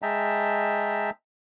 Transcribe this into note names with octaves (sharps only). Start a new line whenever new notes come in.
G#3 D#5 E5 G5 A5 A#5